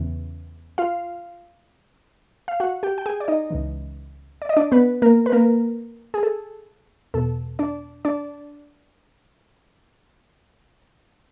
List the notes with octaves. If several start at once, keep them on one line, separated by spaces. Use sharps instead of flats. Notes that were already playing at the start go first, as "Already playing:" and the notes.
Already playing: E2 C#3 E3
F4 F5
F5
F#4 F#5
G4 G5
G5
G#4 G#5
D5
D#4 D#5
C#2 C#3 E3
D5
D#5
D4 D5
B3 B4
A#3 A#4
B4
A#3 A#4
G#4
A4
E2 B2 A4
D4 D5
D4 D5